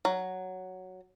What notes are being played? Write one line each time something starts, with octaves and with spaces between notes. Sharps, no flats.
F#3